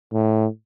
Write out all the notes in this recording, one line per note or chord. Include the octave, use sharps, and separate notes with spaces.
A2